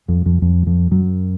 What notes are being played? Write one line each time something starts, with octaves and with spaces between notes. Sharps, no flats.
F2 F3
F2 F3
F2 F3
F2 F3
F#2 F#3